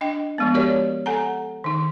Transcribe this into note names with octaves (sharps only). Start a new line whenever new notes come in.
D4 D#5 G5
F3 G#3 B3
F#4 G4 A#4 C#5 D5
A4 F#5 G#5 A#5
D#3 D#4